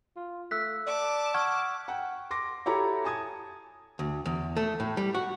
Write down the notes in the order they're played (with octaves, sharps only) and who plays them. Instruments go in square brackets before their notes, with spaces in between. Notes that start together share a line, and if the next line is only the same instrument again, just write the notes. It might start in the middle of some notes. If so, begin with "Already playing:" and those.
[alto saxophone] F4
[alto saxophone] A3 [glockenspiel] E6 F#6 B6
[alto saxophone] D5 [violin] A5 D6
[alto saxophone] F#5 [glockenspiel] C#6 F6 G#6
[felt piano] F#5 G5
C6 D6 A#6
E4 F#4 G4 A4 C#5 A#5
G#5 A5 D#6 G#6
[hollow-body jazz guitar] D2
E2
A3
A2
G3
F#4